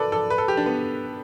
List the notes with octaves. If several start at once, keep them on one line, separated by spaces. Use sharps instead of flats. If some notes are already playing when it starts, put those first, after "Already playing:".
Already playing: A4 B4 D5
A4
B4
A4
G4
D4
B3